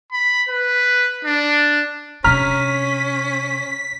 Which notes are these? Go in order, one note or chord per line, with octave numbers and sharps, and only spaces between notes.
B5
B4
D4
C3 C#4 D4 A#5 F6 B6